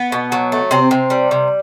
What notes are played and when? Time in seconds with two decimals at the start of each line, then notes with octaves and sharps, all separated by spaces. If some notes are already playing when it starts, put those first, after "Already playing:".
Already playing: B3
0.12 B2
0.32 F#3
0.52 A3
0.71 C3 C4
0.91 C3
1.10 G3
1.31 C3